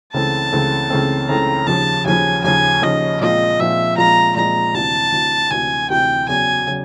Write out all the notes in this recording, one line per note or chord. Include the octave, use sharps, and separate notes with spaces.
C#2 C#3 E3 A3 C4 A5
C#2 C#3 E3 A3 C4
C#2 C#3 E3 A3 C4
C#2 C#3 E3 A3 C4 A#5
D#2 C#3 F3 A5
D#2 C#3 F3 G#5
D#2 C#3 F3 G#5
D#2 C#3 F3 D#5
A#2 F3 G#3 C4 F4 D#5
A#2 F3 G#3 C4 F4 E5
A#2 F3 G#3 C4 F4 A#5
A#2 F3 G#3 C4 F4 A#5
D2 C3 E3 A5
D2 C3 E3
D2 C3 E3 G#5
D2 C3 E3 G5
E2 C#3 F#3 G#5
C#3 F#3